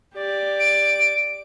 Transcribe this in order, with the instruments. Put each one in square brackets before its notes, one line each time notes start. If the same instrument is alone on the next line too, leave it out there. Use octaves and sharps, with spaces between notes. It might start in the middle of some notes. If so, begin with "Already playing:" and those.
[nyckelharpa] G4 D5
[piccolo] D7